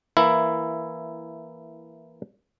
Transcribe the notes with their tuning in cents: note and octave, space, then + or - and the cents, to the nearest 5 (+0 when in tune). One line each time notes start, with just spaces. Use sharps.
E3 +0 A#3 +0 E4 +10